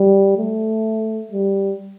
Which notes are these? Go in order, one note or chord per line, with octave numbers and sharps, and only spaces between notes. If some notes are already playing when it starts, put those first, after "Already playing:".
Already playing: G3
A3
G3